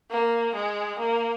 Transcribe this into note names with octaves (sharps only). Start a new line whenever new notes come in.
A#3
G#3
A#3